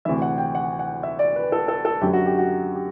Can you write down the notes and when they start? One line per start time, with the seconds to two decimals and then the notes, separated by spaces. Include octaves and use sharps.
0.05 D2 C3 E3 E5
0.22 F#5
0.38 G5
0.55 F#5
0.79 F#5
1.03 E5
1.19 D5
1.36 B4
1.52 A4
1.68 A4
1.85 A4
2.01 F#2 D3 F#3 G4
2.13 F#4
2.26 G4
2.38 F#4
2.75 G4